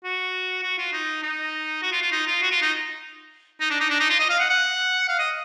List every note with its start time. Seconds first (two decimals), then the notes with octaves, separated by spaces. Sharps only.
0.04 F#4
0.63 F#4
0.78 F4
0.93 D#4
1.23 D#4
1.83 F#4
1.92 F4
2.02 F4
2.12 D#4
2.27 F4
2.42 F#4
2.51 F4
2.62 D#4
3.60 D#4
3.70 D4
3.81 D#4
3.90 D4
4.00 D#4
4.10 F4
4.20 D#5
4.30 F5
4.40 F#5
4.50 F#5
5.09 F5
5.19 D#5